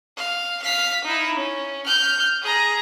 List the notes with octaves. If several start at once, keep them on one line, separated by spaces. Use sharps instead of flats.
F5
F5 B6
D#4 E4
C#4
F6 G6
G#4 A#5